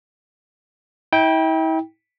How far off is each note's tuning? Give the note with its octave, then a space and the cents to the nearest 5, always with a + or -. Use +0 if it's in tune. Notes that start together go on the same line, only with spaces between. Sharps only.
E4 -40 G5 +0